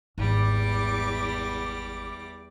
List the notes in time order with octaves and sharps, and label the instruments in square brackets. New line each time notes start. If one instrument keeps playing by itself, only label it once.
[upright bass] G#1 [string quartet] E2 G3 D6